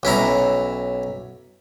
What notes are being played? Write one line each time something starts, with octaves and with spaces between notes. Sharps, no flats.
B1 C#4 E4 A#5